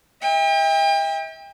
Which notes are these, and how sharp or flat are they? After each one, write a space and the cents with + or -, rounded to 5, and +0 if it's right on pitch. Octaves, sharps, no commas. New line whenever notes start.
E5 -40 G5 +35